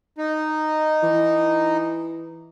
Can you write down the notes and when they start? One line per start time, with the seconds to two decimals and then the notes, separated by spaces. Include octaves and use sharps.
0.18 D#4
1.03 E3